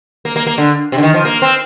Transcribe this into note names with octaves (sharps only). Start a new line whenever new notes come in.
A#3
A#3
A#3
D3
C3
D3
D#3
F3
A#3
C4